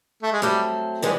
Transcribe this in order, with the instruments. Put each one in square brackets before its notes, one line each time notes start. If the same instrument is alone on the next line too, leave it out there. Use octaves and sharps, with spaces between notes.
[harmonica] A3
G#3
[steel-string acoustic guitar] F#3 A3 C4 [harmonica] G3
[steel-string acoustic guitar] C3 E3 G3 B3 [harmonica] G#3